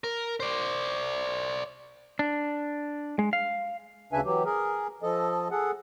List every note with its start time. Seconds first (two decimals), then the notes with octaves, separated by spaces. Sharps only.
0.04 A#4
0.40 C5 D5
2.19 D4
3.19 G#3
3.33 F5
4.13 D2 C#3 D4 B4 E5 G#5
4.25 E3 F#3 G4
4.45 G#4 A#4
5.03 F3 A4 D#5
5.51 G#4 A4 F#5